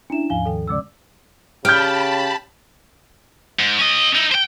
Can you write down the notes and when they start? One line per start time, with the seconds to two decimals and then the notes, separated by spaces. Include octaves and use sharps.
0.10 C#4 D4 E4 E5 E7
0.30 D#2 G#2 F3 F5 G#5 G7
0.46 D#3 A4 G5
0.68 C#3 G#3 C#4 D5 D6 E6
1.65 C#3 G4 G5 A5 B5 F6 G6
3.59 G#2
3.79 C#4 D#5
4.15 D#4 E4
4.32 C5 G5